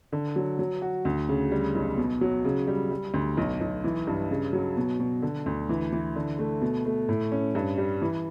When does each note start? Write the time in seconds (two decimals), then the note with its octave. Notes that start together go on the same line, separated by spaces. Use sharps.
0.12 D3
0.36 F#3
0.59 F#3
0.82 F#4
1.05 D2
1.29 C#3
1.52 G3
1.75 B1
1.98 B2
2.21 F#3
2.45 C#3
2.67 G3
2.91 G3
3.14 D2
3.37 B1
3.61 B1
3.84 E3
4.07 G2
4.30 C#3
4.53 F#3
4.77 B2
5.00 B2
5.22 D3
5.46 D2
5.69 E3
5.92 E3
6.16 D3
6.39 A3
6.61 B2
6.85 A3
7.09 A2
7.32 C#4
7.55 G2
7.78 G3
8.02 E3